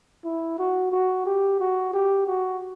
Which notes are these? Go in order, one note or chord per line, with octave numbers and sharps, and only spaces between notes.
E4
F#4
F#4
G4
F#4
G4
F#4